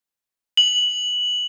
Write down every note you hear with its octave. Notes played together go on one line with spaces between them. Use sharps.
F#7